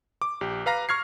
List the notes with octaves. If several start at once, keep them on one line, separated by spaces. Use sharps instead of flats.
D6
A#1 G4
B4 F5 A#5 A#6
C#6 F6 G#6 C7